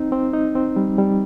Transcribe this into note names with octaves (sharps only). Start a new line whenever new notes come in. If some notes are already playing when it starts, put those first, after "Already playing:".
Already playing: C4 D#4
C4
D#4
C4
G3
G3